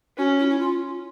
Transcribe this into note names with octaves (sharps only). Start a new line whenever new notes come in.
C#4 F#4
E4
E4
F4